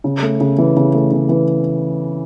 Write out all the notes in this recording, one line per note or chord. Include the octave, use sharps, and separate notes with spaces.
C#3
A3
C#3
E3
C#3
A3
C#3
E3